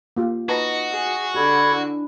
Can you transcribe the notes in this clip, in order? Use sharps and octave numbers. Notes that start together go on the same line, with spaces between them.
A#3 F4 G4
D#4 F#4 B4 A5 A#5
G#4
D3 G4 A4 B5 G#6
D4 E4